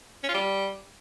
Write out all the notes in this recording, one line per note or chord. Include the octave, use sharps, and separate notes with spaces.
C#4
F4
G3